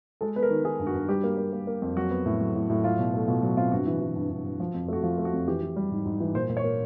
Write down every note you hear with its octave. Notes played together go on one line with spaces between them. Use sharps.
G#3 A4
B3 B4
A#4
D#3
D#3 G#4
G2
F#4
G2
G3 G4
A#3
A#3
A#3
A#3
F2
F#3 F#4
B3
A2
F#3
A2
A2
F#3 F4
B2
A3
B2 F4
F#3 F#4
C4 F4
G2 F#4
E3
E3
G2
G2
G2
F3
F2
A3 F#4
F3 F4
A3
F#4
F2
E3 G4
E3
G3
G#2
G#2
E3
A#2 C5
A#2
C#5
A#3